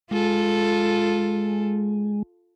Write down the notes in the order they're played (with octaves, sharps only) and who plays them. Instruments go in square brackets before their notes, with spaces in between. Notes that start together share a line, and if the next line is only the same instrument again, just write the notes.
[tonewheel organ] G#3 [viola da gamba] F4 A4